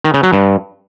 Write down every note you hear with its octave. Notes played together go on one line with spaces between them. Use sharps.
D#3
C#3
F#3
G2